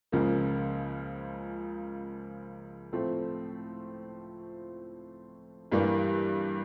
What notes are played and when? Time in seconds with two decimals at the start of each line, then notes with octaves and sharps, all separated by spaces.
0.12 C#2 C#3 F3 A#3
2.93 A2 F3 A3 C4
5.72 G2 E3 G3 A#3